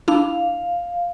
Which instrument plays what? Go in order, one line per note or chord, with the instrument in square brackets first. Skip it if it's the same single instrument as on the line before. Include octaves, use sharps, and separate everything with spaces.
[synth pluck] D4 E4 [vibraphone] F5